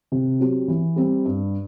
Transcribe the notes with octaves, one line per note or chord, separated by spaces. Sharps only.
C3
F#3 C4 G4
E3
G3 C4
G2